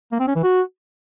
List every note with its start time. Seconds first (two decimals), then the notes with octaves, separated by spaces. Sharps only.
0.12 A#3
0.20 C4
0.28 C#4
0.35 E3
0.43 F#4